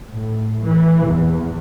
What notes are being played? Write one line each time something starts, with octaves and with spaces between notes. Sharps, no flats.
A2
E3
E2